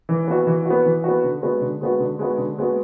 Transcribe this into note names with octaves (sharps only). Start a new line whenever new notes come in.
E3
B3 F#4
E3
B3 F#4
E3
B3 F#4
D3
G#3 B3 F#4
D3
G#3 B3 F#4
D3
G#3 B3 F#4
D3
G#3 B3 F#4